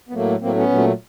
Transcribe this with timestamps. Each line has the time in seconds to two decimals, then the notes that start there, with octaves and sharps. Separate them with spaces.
0.09 B3
0.13 A2 F#3 A3 A#3
0.41 A2 F#3 A3 A#3 C4
0.55 B3 C#4
0.69 A#2 F#3 A3